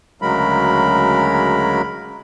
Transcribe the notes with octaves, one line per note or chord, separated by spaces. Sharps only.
D2 C#3 F#3 G#3 A#4 B5